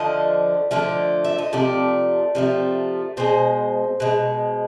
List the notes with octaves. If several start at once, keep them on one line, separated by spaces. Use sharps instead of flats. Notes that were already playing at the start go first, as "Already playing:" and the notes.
Already playing: D3 F3 A3 D#5
D3 F3 A3
E5
D#5
C3 F3 A3 D5
C3 F3 A3
B2 G#3 C5
B2 G#3